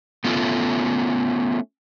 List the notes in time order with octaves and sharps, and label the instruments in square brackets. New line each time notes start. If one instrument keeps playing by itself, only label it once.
[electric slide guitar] A3 B3 C#4 F4 A4